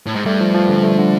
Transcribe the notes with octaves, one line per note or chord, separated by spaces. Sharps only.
A2
G#2
G2 A3
F3
F3
D3
A3
D3